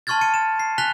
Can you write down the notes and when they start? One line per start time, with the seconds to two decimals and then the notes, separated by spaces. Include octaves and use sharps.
0.07 A5 C6 C#6 F6 G#6 A6
0.21 A5 C#7 D#7
0.34 E7
0.60 C7
0.78 G#5 F#6 B6 F7 G7